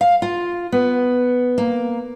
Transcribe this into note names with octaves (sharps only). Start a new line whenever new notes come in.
F5
F4
B3
A#3